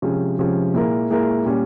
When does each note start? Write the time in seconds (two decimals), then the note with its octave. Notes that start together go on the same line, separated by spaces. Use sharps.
0.02 C3 F3 G#3 C#4
0.39 C3 F3 G#3 C#4
0.74 A#2 G#3 E4 A#4
1.10 A#2 G#3 E4 A#4
1.45 A#2 G3 C#4